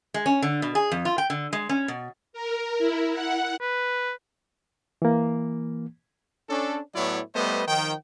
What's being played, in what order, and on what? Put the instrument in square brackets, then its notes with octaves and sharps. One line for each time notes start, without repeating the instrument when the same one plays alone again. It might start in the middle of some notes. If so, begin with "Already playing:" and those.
[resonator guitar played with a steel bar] G#3
C#4
D3
B2
G#4
F2
F4
G5
D3
G#3
C#4
B2
[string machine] A#4
E4
F#5
[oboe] B4
[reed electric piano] E3 A#3
[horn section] C#4 D4 A4
A2 F#3 B3 E4 C#5 D5
G3 A3 B3 B4 C5 D#5
D#3 F3 G5